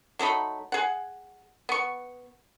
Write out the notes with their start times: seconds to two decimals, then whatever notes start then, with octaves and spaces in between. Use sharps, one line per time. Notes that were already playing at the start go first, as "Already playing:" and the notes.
0.19 F#3 A3 D#4 B5
0.72 G#4 F#5
1.69 B3 C#6